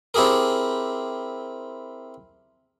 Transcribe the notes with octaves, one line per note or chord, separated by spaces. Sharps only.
C4 E4 G4 G#4 A#4